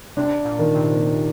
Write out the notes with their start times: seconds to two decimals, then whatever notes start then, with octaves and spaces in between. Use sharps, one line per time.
0.16 C3 D4
0.44 A#2
0.59 D#3
0.73 C3